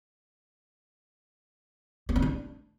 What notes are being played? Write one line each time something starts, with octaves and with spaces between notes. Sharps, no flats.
B3
C4
D4